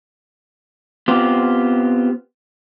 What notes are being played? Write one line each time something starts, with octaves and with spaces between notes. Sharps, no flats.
B3 C4 F4 G4